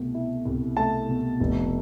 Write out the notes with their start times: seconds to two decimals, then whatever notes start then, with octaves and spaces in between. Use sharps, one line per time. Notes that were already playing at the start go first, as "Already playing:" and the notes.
Already playing: C2 B2 A3
0.14 E4
0.45 C2
0.77 A3 A5
1.09 B2
1.40 F1